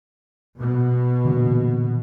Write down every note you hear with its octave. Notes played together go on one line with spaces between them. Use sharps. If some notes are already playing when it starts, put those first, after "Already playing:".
B2
A#2 D3 E3